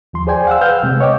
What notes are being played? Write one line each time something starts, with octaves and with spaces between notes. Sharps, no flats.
D#2 F3 C6
G#4 C5 D5 G5 G#5
F5 F#5 E6
B4 F5 F#5 E6 F6 G6
C3 G#3
C#5 D#5 G5 D6